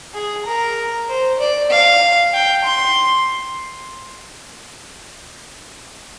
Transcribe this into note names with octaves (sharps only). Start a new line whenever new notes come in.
G#4
A#4
C5
D5
F5
G5
C6